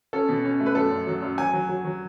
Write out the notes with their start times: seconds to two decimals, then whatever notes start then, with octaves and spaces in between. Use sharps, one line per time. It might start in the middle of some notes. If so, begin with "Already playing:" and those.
0.13 C#4 A4
0.29 B2
0.45 C#4
0.60 A3
0.66 B4
0.75 F#2 A4
0.91 F#2
1.07 F#3
1.22 F#2
1.38 F#3 G#5
1.53 F#3
1.69 F#3
1.85 F#3